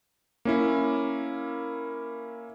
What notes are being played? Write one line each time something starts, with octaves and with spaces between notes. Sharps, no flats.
A#3 C#4 E4